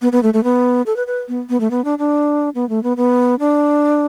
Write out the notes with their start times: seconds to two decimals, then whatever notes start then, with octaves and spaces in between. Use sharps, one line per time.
0.02 B3
0.12 B3
0.23 A3
0.34 A3
0.44 B3
0.86 A4
0.97 B4
1.07 B4
1.28 B3
1.50 B3
1.60 A3
1.71 B3
1.85 D4
1.99 D4
2.55 B3
2.69 A3
2.83 B3
2.97 B3
3.40 D4